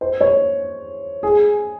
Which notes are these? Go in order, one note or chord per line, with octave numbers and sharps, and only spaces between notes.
C5
C#5
G#4